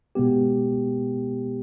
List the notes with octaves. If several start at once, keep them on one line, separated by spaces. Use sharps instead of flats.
B2 G#3 B3 G4